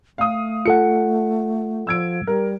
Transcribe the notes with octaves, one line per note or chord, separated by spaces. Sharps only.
A3 F5 D#6
F4 A4 F#5 C#7
F3 E6 G#6 D7
G3 A#4